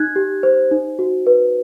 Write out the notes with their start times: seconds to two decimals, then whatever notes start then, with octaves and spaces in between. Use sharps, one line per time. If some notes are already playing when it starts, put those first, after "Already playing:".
Already playing: D#4 F#6 G#6
0.16 G4
0.43 C5
0.71 D#4
0.99 F#4
1.27 B4